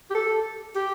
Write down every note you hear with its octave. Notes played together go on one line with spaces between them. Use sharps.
G4
A4
G4